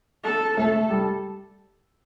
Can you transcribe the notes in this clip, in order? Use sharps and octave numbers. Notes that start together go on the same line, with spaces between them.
A4
A3 A4
G3